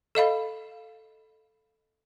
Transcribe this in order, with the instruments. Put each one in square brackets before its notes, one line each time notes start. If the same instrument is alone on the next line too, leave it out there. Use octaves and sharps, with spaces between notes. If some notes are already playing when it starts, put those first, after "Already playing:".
[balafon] A4 D#5 F5 B5